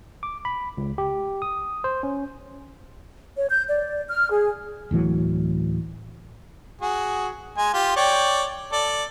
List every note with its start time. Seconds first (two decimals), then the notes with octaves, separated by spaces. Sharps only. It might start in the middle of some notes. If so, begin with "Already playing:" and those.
0.23 D6
0.45 B5
0.77 C#2
0.98 G4
1.42 D#6
1.84 C5
2.03 C#4
3.35 C#5
3.50 G6
3.67 D5
4.08 F6
4.30 G#4
4.91 D1 A2 E3 F#3
6.82 F#4 G#4
7.58 G#3 G#5
7.74 F4 G4
7.96 C#5 D5 G5
8.72 A4 D5